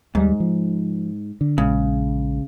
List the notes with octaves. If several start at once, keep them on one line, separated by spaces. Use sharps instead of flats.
D#2 G#2 G3
F3
D3
A#1 C#3 G#3